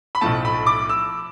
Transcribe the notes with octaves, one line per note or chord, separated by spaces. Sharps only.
B5
B1 A2 F3 A3 A5
B5
D6
E6